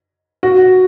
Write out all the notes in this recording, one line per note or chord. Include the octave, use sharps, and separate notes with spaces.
F#4